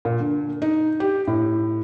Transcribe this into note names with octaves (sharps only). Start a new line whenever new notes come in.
A#2
D3
D#4
G4
A2